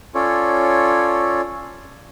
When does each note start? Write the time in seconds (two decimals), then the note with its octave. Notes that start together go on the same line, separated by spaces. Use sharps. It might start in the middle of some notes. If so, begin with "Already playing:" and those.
0.15 C#4 F4 A4 C#5 D5